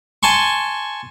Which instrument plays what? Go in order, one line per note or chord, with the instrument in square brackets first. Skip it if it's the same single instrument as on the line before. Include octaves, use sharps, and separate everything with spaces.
[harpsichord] G#5 A5 C6 C#6